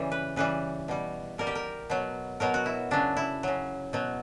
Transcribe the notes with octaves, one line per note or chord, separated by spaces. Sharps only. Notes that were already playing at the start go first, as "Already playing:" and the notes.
Already playing: C#3 E3 G3
B4
C#3 E3 G3 B4
B2 G3
B2 G3 A#4
G4
A#4
B2 F#3
B2 F#3 A#4
F#4
E4
C#3 F#3 D4
E4
C#3 F#3
B2 F#3